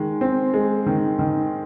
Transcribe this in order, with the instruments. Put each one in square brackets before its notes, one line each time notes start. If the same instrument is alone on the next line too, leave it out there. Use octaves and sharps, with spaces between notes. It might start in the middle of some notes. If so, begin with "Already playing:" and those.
Already playing: [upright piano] D#3 G#3
C4
G#3
D#3
D#3